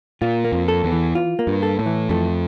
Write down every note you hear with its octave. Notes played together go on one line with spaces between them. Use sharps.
A#2 F4
A#3
F2
A4
E2
E3
F4
A#3
G2
A4
A2
E3
F2 A3